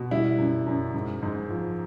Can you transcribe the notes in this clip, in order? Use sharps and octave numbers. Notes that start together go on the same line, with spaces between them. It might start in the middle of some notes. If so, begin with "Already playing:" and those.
Already playing: B2
G3 E4
F#2
F#2
G#2
G#2
F3